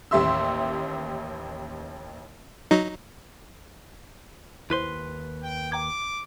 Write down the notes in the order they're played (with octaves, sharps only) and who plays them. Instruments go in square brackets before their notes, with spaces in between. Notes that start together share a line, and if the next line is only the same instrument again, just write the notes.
[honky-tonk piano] A1 D#2 G4 E5 C6 E6
[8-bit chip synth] F#3 D#4
[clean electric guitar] D#2 B4 C6 [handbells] E4 C5
[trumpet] G5
[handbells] G5 A#5 G#6 [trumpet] D6